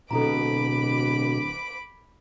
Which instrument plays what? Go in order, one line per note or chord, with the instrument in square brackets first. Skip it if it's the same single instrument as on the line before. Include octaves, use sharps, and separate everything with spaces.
[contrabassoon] D1 [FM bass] B2 [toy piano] A4 A#5 [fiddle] B5 D6